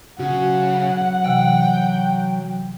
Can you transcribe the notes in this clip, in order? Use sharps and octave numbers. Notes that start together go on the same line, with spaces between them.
C#3 F#3 F#4 F#5
C3 E3 G5